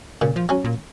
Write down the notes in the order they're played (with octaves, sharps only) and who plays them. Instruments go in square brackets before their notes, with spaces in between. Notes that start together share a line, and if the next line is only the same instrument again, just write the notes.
[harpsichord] A#2 [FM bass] C#3
[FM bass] F3
[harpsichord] F#3 C#4
[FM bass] A#2